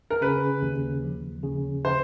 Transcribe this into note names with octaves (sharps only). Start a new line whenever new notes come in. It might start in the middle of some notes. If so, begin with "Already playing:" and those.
A#4
C#3 B4
D#2
F3
C#3
C5